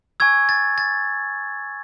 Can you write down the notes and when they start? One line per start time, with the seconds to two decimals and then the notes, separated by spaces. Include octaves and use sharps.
0.20 G#5 C#6 E6 G#6
0.49 A6
0.78 A6